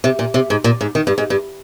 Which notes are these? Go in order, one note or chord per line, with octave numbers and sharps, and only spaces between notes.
C3
A#2
C3
G#2
A#2
G#2
D#3
G2
G#2
G2